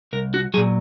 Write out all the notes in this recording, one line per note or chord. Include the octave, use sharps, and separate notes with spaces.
C2 A#4
F#4
A#2 F#3 G#4